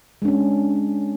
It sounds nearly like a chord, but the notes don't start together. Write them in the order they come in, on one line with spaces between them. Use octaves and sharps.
G#3 D4 C#4